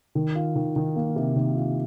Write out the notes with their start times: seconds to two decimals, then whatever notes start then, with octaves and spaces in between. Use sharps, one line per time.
0.15 D#3
0.35 F4
0.56 D#3
0.76 D#3
0.96 A#3
1.16 C3
1.36 D#3
1.56 F4